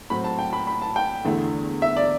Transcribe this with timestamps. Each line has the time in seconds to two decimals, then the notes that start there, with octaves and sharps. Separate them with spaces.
0.10 A2 F#3 C4 B5
0.24 A5
0.39 G5
0.53 B5
0.67 B5
0.82 A5
0.96 G5
1.25 E2 D3 A3 E4
1.82 E5
1.96 D5